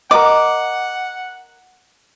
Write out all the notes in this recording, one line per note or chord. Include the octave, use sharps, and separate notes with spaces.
A#4 D#5 F#5 D6